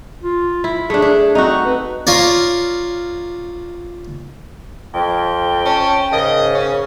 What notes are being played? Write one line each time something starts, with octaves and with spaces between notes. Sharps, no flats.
F4
E4
A3 D4 G#4
D4
C4 D#4 F#4
B4
F4 A#4 C#5 D5
F2 G5
C#4 A5
G#2 C#3 A#4 D#5
C#4